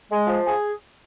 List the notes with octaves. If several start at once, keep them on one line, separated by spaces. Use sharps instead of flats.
G#3
F3
G#4